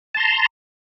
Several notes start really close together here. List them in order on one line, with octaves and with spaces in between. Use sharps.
A5 C6 A#5